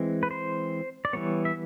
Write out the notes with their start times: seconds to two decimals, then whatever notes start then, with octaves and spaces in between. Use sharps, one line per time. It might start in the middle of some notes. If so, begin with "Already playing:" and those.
Already playing: E3 G#3 C4
0.23 B4
0.31 C5
1.05 D5
1.13 E3 G3 B3 C#5
1.45 E5